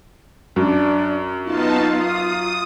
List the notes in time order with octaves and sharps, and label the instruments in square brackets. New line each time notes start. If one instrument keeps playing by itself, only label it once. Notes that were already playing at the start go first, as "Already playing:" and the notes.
[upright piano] F#2 [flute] D4
[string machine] B3 D#4 A5 [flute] F4
[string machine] D#6